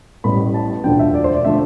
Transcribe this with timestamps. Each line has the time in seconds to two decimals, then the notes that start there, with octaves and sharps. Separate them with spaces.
0.24 A1 A2 G3 B3 B5
0.54 A5
0.84 E1 D2 D3 F3 G5
0.99 E5
1.14 D5
1.24 C5
1.34 D5
1.45 D3 F3 A3 E5